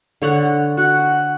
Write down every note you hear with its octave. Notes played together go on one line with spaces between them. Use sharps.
D3 C#5 F#5
F#4 F#5